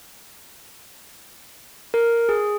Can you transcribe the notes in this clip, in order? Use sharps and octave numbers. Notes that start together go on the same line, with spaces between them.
A#4
G#4